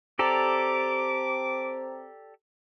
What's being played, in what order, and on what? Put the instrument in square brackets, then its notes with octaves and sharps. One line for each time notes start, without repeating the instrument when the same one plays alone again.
[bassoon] C4 [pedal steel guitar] G4 A4 D5 [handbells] A#5 [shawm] D6